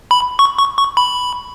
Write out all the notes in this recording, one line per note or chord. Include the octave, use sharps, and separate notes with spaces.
B5
C#6
C#6
C#6
B5